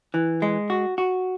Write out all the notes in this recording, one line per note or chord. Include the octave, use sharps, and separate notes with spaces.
E3
G#3
F#4
F#4